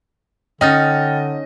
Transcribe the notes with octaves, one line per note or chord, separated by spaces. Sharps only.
D3 C#4 D#4 D#5 G5 F6 A6